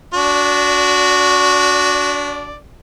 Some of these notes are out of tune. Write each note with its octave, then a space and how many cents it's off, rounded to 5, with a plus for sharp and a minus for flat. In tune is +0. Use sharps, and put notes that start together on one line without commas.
D4 -30 F#4 -5 D5 +0